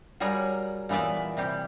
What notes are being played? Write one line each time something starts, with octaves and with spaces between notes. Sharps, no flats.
F#3 G3 G#4 A#4 F#5
A#2 E3 B3 D5 E5
C3 G3 G4